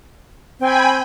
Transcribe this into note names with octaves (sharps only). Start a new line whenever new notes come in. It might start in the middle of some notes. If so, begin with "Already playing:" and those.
C4 G5 G#5 B5